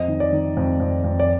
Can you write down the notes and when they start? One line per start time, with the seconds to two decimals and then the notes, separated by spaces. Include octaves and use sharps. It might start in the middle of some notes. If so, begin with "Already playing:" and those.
Already playing: F2 D#5
0.08 D#3
0.20 D5
0.33 D#3
0.57 F2
0.80 F2
1.04 F2
1.20 D5